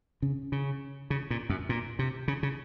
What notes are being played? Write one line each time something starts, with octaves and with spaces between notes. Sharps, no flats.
C#3
C#3
C#3
A#2
F#2
A#2
C3
C#3
C#3